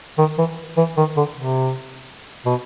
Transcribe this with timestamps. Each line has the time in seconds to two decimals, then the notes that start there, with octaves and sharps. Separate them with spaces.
0.18 D#3
0.38 E3
0.77 E3
0.97 D#3
1.17 D3
1.36 C3
2.46 B2